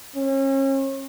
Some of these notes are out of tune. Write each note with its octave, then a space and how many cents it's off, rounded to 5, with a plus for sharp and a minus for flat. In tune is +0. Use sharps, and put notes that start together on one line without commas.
C#4 -35